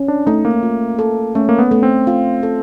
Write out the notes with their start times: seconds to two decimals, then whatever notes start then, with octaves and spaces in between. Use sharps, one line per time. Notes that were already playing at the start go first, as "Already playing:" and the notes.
Already playing: C#4
0.08 D4
0.27 A3 D#4
0.45 A#3
0.63 F4
0.99 A4
1.35 A3 C#4
1.49 A#3
1.58 B3
1.71 A3
1.83 C4
2.07 F4
2.43 A4